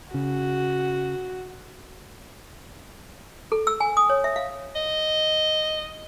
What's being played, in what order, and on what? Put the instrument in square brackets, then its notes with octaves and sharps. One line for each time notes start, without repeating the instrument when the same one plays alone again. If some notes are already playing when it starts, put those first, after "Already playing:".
[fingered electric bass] C#3 [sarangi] F#4
[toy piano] A4
E6
G#5
D#6
C#5
E5
F5
[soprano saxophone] D#5